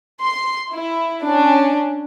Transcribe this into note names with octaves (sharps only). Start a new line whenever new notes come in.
C6
E4
C#4 D4